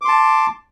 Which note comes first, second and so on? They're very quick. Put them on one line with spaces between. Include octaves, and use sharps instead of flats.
D6 C6 A5